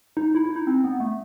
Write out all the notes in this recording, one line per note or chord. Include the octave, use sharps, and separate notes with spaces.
D#4
E4
E4
D#4
C4
B3
A3